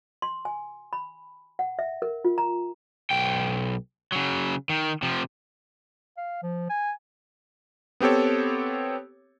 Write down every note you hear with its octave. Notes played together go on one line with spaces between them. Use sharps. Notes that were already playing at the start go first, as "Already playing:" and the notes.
C6
G#5
B5
F#5
E5
A#4
F4
A#5
B1 G5
C#3 F#3
D#3
C3 F3
F5
F3
G#5
B3 C4 G4 A4 C#5